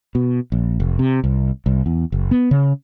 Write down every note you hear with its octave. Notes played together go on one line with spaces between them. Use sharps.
B2
A#1
F1
C3
C2
C2
E2
F#1
B3
C#3